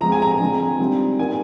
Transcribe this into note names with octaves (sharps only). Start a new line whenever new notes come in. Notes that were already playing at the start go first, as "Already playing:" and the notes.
F3 G#3 C4 A#5
G#5
A#5
D3 G#3 C4
D#3 G3 C4 F4
D#3 G3 A#3 D4 F4 G#5